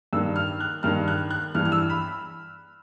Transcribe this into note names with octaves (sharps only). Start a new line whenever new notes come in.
G2 D#3 E6
F6
F#6
G2 D#3 F6
F#6
F#6
G2 E3 F6
F6
E6
B5